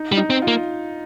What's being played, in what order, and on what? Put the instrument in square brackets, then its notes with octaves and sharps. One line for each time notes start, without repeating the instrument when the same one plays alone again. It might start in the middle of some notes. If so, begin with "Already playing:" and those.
Already playing: [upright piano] D#4
[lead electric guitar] G3
[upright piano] D#4
[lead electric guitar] C4
[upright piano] F4
[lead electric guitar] A#3